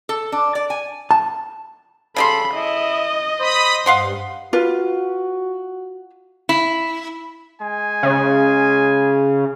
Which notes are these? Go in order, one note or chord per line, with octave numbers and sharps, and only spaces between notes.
A4
D4
D5
G#5
A5
C#3 G3 A4 B5 C6
E4 D#5
C5 B5 D#6
G2 F5 F#5 C6
F4 F#4 B4
E4
G#3 G#5
C#3